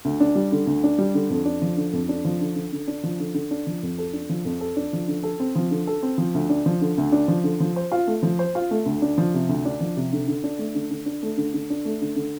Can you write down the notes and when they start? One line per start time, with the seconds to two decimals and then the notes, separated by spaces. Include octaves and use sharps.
0.05 D2
0.20 D4
0.35 G3
0.52 D3
0.67 D2
0.84 D4
0.99 G3
1.14 D3
1.30 F2
1.45 D4
1.62 F3
1.77 D3
1.93 F2
2.09 D4
2.25 F3
2.41 D3
2.56 D3
2.73 D3
2.88 D4
3.03 F3
3.20 D3
3.34 D3
3.51 D4
3.67 F3
3.83 F2
3.98 A4
4.13 D4
4.29 F3
4.45 F2
4.61 A4
4.77 D4
4.93 F3
5.08 D3
5.23 A4
5.40 C4
5.55 F3
5.71 D3
5.87 A4
6.03 C4
6.18 F3
6.34 D2
6.50 D4
6.66 F3
6.81 D3
6.98 D2
7.12 D4
7.28 F3
7.44 D3
7.60 F3
7.76 C5
7.92 F4
8.07 A3
8.23 F3
8.39 C5
8.55 F4
8.71 A3
8.86 D2
9.02 D4
9.18 F3
9.34 C3
9.49 D2
9.65 D4
9.80 F3
9.97 C3
10.13 D3
10.28 D3
10.44 D4
10.59 A3
10.75 D3
10.91 D3
11.06 D4
11.23 A3
11.37 D3
11.54 D3
11.70 D4
11.85 A3
12.02 D3
12.16 D3